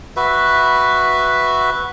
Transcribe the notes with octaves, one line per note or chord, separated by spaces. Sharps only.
F#4 B4 E5